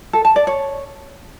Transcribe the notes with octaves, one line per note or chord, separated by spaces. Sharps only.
A4
A5
D5
C#5